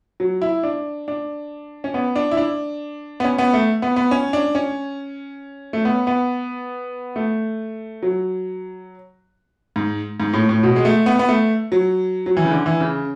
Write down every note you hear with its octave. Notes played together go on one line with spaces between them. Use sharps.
F#3
E4
D4
D4
C#4
B3
D4
E4
D4
B3
C#4
B3
A3
B3
B3
C#4
D4
C#4
A3
B3
B3
A3
F#3
G#2
G#2
A2
A2
B2
G#3
A3
B3
B3
A3
F#3
F#3
E3
C#3
D3
E3
C#3